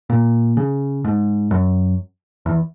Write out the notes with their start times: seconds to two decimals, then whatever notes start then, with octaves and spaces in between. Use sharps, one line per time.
0.10 A#2
0.57 C#3
1.05 G#2
1.51 F#2
2.46 E2